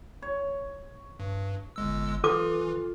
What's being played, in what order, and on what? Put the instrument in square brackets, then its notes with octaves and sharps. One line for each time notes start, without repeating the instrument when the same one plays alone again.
[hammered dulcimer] C#5
[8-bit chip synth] G2
G1 G#3 E6
[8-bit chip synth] E3 [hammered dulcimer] F4 [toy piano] A4 D6